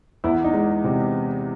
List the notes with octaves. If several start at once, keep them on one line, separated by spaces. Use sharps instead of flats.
E2 E4
D#4
G#3
C3